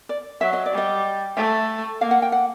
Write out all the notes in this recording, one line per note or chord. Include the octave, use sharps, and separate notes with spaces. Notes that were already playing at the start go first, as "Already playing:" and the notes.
D5
F#3 E5
D#5
D5
G3
D#5
A3 E5
A#3 F5
F#5
G5
F#5